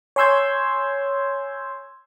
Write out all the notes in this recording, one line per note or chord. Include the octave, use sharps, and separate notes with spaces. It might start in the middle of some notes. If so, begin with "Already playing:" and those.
C#5 G#5 C6 E6 G6 G#6